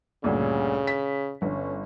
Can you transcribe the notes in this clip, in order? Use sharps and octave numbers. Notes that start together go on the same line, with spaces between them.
D2 G2 A#2 C#3
B6
G1 C#4